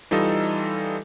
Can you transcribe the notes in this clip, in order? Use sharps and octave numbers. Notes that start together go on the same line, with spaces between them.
E3 G3 D#4 F4 A4 D#5